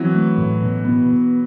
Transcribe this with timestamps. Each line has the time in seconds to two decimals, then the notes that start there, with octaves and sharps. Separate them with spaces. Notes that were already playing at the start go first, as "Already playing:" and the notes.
Already playing: E3 F#3 C4
0.14 A3
0.38 A2
0.62 B2
0.85 B3
1.09 B2